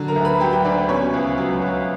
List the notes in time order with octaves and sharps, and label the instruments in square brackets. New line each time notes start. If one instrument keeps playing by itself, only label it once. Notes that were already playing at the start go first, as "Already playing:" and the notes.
Already playing: [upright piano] D3 F#3
A#4 A#5
D2
B4 B5
F#3 G4 G5
G4 G5
D2 D4 D5
B2 C#4 C#5
C#2
F#3
C#2